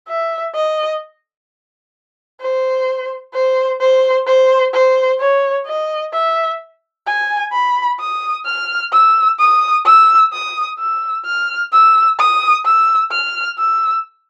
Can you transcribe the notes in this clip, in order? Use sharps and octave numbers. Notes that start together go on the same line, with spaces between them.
E5
D#5
C5
C5
C5
C5
C5
C#5
D#5
E5
G#5
B5
D#6
F6
E6
D#6
E6
D#6
E6
F6
E6
D#6
E6
F6
E6